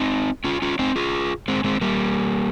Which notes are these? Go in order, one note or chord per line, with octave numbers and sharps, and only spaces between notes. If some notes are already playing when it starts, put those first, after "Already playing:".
Already playing: C4 D#4
C#4 F4
C#4 F4
C4 D#4
F4 G#4
G#3 C4
G#3 C4
G3 A#3